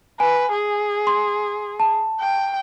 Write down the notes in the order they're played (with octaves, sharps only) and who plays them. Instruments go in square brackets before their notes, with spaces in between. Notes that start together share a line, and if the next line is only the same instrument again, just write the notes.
[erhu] B4 [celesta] G#5
[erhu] G#4
[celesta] C6
A5
[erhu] G5